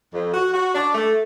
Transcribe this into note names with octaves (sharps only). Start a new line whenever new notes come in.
F2
F#4
F#4
D4
A3